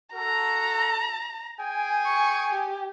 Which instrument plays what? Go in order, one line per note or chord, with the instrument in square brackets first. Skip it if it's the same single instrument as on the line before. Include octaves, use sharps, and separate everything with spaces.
[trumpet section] F#4 A4 [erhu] A#5
[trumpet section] G#4 G5 G#5
[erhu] C#6
G4